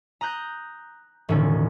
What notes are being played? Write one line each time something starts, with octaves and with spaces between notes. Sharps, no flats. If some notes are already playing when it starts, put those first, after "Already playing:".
A#5 D#6 F#6 G6 A#6
E1 A2 D3 D#3 C#4